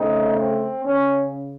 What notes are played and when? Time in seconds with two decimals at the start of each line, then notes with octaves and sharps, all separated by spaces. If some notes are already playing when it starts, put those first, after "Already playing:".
Already playing: C#3 A3 C4 D#4
0.38 C4
0.85 C#3 C#4